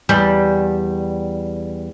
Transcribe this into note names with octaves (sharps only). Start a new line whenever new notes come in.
E2 G3